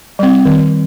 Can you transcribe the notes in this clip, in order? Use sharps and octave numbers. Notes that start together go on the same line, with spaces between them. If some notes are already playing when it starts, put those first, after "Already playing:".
G3 C4
D#3